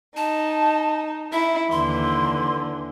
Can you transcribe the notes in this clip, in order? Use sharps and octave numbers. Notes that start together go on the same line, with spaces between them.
D#4 A5
E4 E5
D#2 D3 E3 C6